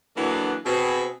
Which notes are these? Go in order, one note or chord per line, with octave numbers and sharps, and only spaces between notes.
D3 E3 F#3 A#3 B3 D4
B2 C4 G#4